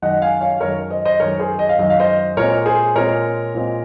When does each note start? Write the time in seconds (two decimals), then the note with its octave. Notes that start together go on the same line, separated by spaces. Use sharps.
0.02 F#2 D#3 G#3 D#5 F#5
0.22 F5 G#5
0.41 C#5 F5
0.61 F#2 D#3 G#3 A#4 C#5
0.90 C5 D#5
1.05 C5 D#5
1.19 F#2 D#3 G#3 A#4 C#5
1.40 G#4 C5
1.59 D#5
1.69 F5
1.78 F#2 D#3 G#3 D#5
1.90 F5
2.00 C5 D#5
2.37 A#2 G#3 C4 A#4 C#5
2.66 G#4 C5
2.96 A#2 G#3 C4 A#4 C#5
3.55 A#2 G#3 C4